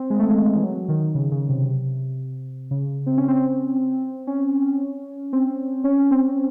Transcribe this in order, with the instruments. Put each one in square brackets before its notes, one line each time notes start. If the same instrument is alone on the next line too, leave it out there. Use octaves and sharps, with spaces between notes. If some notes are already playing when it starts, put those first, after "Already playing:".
Already playing: [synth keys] C4
G#3
A3
G#3
E3
F#3
D#3
C#3
C#3
C3
C#3
C4
C#4
C4
C#4
C4
C#4
C4